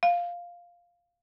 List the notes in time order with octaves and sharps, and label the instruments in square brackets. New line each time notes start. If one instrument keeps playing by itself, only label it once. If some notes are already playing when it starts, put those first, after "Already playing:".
[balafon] F5